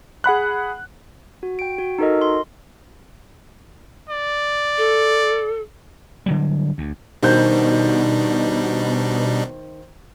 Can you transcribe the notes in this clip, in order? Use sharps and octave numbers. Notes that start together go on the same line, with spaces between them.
G#4 F#5 B5 F#6
F#4
G5 D7
F#4
D#4 F#4 A4 A#4 D#5
C6
D5
A4
D3 F#3 G3
D2
B2 D#3 G3 D4 D#4 C5 G6